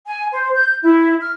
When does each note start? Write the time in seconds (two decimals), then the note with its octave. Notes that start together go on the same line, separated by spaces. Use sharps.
0.06 G#5
0.31 C5
0.55 G6
0.83 E4
1.21 F6